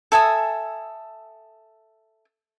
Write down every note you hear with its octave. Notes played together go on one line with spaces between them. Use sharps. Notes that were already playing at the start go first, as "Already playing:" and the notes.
A4 E5 G#5 D#6